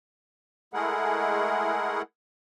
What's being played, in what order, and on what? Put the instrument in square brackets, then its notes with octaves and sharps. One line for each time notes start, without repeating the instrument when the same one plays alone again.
[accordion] G#3 A3 E4 G#4 A#4 F#5